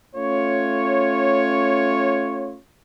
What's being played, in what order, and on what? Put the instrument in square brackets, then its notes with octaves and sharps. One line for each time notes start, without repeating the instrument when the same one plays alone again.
[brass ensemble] A3 C#4 F4 C#5